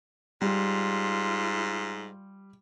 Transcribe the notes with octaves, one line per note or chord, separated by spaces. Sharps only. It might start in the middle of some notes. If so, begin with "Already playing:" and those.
G#2 G3 F4